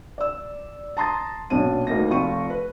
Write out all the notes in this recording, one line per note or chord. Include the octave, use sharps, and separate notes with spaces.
D5 E6
A5 A#5 C6 D#6 A6
B1 A#2 C#4 D4 D#7
D2 A#3 D#4 A#6
F1 F4 G5 B5 C#6 D#7
B4